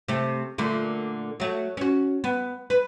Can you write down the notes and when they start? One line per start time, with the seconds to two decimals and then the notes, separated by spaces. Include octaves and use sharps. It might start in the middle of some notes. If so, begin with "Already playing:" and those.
0.08 C3 A3
0.58 A#2 D3 A3
1.40 F#3 A3
1.77 C#4 F#4
2.24 B3
2.70 B4